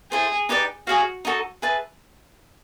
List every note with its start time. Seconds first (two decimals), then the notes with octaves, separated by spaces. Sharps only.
0.12 E4 G#4 A4 C5
0.49 D#4 G4 B4 D5
0.87 F#4 G#4 C#5 F5
1.25 D#4 F#4 A4
1.62 G#4 B4 E5 A5